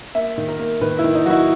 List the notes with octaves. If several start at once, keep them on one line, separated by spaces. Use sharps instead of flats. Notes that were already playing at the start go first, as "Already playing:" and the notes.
A#3 E5
D#3
A#4
A#3
D#3 B4
E4
D#3
D#4
F#3 F#4
E4